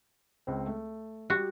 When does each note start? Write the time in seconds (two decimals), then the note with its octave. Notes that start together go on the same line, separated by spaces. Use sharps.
0.47 C#2 C4
0.66 A3
1.30 G3 F#4 G4